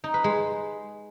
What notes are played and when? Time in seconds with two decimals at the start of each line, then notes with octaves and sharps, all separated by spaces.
0.04 D#4
0.14 B4
0.24 G#3